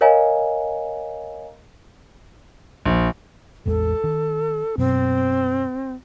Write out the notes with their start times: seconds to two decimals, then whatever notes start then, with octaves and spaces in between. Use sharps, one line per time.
0.01 A#4 C#5 D#5 F5 G#5 A#5
2.85 A#1
3.66 A1 E2 G#3 A4
4.04 D#3
4.78 F#2 B2 C4